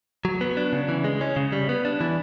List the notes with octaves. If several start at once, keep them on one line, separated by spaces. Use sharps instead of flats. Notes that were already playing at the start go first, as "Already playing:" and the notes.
F#3
B3
D4
C#3
E3
G#3
C#4
C#3
G3
B3
D4
E3